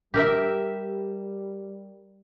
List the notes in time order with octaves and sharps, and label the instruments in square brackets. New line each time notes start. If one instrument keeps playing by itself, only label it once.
[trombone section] G3 [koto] G4 A#4 E5